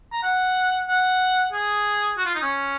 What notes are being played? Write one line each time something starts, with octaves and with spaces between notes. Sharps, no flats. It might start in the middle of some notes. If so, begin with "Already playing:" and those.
A#5
F#5
F#5
G#4
F#4
F4
D#4
C#4